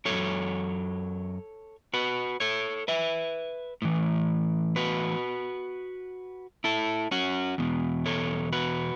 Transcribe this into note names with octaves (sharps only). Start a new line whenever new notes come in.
F#2 F#3 A4 C#5
F#4 B4
A4 C#5
B4 E5
A2 E3
F#4 B4
E4 A4
C#4 F#4
E2 B2
A4 C#5
F#4 B4